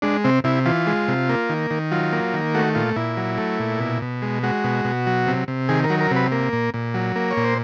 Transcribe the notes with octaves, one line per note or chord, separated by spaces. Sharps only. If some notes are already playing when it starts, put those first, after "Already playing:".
G#3 D4
C3 C4
C3 E4
E3 F4
G#3
C3
A#3
D#3
D#3
F#3 F4
A#3
D#3
A3 F#4
A#2 F4
A#2 E4
F#3
A3
A#2
B2
B2
G#3
G#3 F#4
B2
B2
F#3
C3
C3
D#3 G#4
A#4
F#3
A#4
C3 B4
A#3
A#2
A#2
F#3
A#3
C#5
A#2
C5